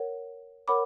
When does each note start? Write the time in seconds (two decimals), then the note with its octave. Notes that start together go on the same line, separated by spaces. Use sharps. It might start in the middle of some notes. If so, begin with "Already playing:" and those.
Already playing: A#4 C#5 F#5
0.68 A#4 C#5 F#5 B5 D6